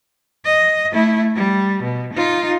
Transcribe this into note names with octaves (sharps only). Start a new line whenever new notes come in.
D#5
A3 E4
G3
B2
D#4 F4